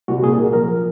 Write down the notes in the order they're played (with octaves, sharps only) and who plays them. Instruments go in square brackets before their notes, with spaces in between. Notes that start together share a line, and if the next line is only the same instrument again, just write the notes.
[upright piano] C2 [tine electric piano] F#4
[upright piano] A#2 [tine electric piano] G#4
[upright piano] A#3 [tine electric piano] G#4
[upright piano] F3 [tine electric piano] A#4